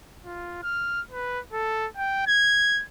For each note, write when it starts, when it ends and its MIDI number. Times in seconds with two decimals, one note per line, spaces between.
0.25 0.63 65
0.63 1.01 89
1.11 1.39 71
1.53 1.87 69
1.97 2.25 79
2.27 2.83 92